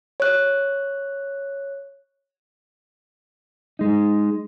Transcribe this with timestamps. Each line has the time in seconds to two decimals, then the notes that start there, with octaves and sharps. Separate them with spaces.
0.20 C#5 F#6
3.79 G#3 D#4